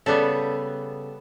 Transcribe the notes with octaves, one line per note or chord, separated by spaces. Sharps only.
C#3 G3 B3 A4